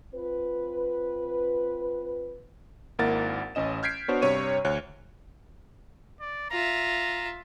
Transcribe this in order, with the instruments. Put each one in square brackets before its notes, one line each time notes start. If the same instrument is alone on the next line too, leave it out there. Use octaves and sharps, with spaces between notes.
[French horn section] C4 F4 B4
[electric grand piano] G#1 A#3 E4 A#4 F#5 A6
A1 C#4 D#5 E7
F6 G6 G#6 B6 C7 D7
B3 D4 F#4 C5 C#5
G2 C3 C#5 C#6 D#7
D2 C#5 F#6
[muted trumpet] D5
[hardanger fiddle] F4 E5 [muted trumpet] A#5